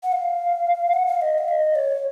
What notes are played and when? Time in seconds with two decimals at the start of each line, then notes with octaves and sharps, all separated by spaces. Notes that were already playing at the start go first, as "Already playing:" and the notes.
0.03 F#5
0.12 F5
0.93 F#5
1.07 F5
1.22 D#5
1.38 F5
1.48 D#5
1.75 C#5